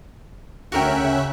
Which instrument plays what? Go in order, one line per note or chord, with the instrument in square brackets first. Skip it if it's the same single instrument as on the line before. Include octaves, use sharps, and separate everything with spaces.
[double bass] D2 [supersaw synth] C#4 E5 F#6 [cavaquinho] F#4 A#4 G5
[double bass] C#3